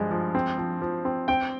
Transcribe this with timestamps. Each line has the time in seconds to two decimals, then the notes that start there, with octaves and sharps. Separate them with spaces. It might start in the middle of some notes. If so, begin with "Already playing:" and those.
Already playing: G2 F3 G#3
0.11 F3
0.35 C4
0.58 F3
0.82 F3
1.05 C4
1.28 C4 G5